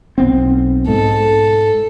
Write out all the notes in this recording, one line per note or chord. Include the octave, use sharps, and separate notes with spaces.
B1 B3 C4
G#2 A4